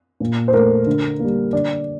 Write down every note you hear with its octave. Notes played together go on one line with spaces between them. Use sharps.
A#2
C5
A3 A#4
D3
G3 A#3
D3 D5